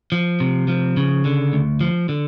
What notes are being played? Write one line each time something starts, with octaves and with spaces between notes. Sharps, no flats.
F3
C3
F3
C#3
D3
D2
F3
D3